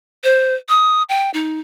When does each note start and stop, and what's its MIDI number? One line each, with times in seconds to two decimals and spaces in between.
0.24 0.55 72
0.69 1.03 87
1.09 1.30 79
1.34 1.60 63